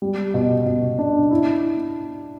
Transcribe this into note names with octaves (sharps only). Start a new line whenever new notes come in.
G3
B2
B2
D4
E4